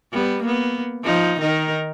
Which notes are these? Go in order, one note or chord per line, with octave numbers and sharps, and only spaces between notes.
G3 B3
A#3 B3
F3 D#4
D#3 D#4 A#4